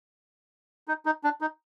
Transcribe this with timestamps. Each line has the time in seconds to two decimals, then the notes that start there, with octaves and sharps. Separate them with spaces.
0.88 D#4
1.06 D#4
1.24 D4
1.41 D#4